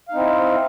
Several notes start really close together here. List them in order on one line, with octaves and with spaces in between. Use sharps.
F5 D#4 C4 E4